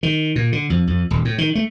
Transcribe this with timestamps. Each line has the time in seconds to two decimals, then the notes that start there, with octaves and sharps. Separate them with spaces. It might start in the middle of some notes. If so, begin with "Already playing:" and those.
0.03 D#3
0.36 A#2
0.52 D3
0.70 F2
0.87 F2
1.10 D#1
1.25 A2
1.38 D#3
1.55 A3